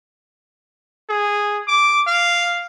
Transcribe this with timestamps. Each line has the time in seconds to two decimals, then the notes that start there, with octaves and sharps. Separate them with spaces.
1.09 G#4
1.68 D6
2.07 F5